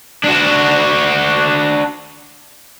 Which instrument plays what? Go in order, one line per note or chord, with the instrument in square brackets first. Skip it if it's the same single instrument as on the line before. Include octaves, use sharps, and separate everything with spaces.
[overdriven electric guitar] D4 F#4